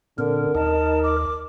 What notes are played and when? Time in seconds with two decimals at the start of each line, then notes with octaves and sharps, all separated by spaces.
0.18 A#2 D3 C4 A#4
0.55 D#2 D#4 D#5 A5
1.03 D6